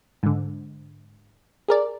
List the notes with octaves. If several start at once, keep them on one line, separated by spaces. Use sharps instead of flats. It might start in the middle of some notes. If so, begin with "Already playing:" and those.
G#2 D3
G#4 A#4 D5